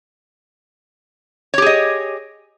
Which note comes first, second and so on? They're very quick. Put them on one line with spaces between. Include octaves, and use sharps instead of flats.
C#5 G4 G#4 D#5